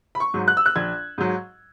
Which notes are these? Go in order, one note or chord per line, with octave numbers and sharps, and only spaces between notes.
B5
C#6
G#2 F#3
F#6
E6
F#6
A#1 G#6
G#2 F#3